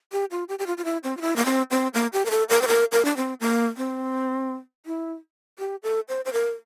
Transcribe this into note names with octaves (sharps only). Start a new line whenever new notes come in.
G4
F4
G4
G4
F4
F4
E4
C4
F4
E4
A#3
C4
C4
A#3
G4
A#4
A4
A#4
C5
A#4
A#4
D4
C4
A#3
C4
E4
G4
A4
C5
C5
A#4